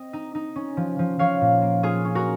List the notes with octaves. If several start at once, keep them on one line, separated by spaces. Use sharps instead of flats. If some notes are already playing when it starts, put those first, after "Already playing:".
Already playing: C4 D#5
D#4
D#4
C#4
F3
F3
F3 C#5 F5
A#2
A#3
F#3 F4 G#4
C#4
F#4 A#4